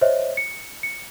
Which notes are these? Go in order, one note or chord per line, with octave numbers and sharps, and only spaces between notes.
C5 C#5 D#5 E5
C#7
C#7